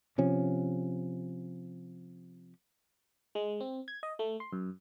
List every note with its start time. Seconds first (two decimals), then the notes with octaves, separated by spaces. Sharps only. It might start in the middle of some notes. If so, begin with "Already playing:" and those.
0.18 C3 F3 C#4
3.35 G#3
3.60 C4
3.88 G#6
4.03 D#5
4.19 A3
4.40 C6
4.52 F#2